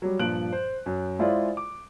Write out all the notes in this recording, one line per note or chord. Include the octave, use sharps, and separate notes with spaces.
F#3 G3
G2 A#2 F3 F#6 D7 F#7
C5
F#2
G#3 E4 F4 G#4 C5 D5
D6